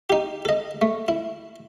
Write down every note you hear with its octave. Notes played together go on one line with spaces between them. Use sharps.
D#4 G4
A4 D#5
A3
E4